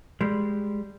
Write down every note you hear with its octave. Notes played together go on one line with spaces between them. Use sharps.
G3 G#3